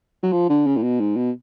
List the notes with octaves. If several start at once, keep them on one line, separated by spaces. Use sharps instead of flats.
F#3
F3
D3
C#3
A2
B2
G#2
B2